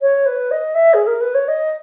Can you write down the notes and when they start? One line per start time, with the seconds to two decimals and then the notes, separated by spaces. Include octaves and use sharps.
0.01 C#5
0.25 B4
0.50 D#5
0.74 E5
0.93 G#4
1.06 A#4
1.20 B4
1.34 C#5
1.47 D#5